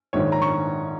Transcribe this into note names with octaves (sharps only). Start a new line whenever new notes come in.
A#1 G#2 D#3 C#5
A#5
C#6